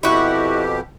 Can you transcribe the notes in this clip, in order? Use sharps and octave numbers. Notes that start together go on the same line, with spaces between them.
F2 B2 E4 F#4 G4